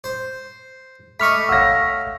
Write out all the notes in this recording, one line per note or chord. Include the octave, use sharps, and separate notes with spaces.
C5
A3 D#5 B5 C#6 D6 F6 B6
C#5 F5 F#5 E6 A#6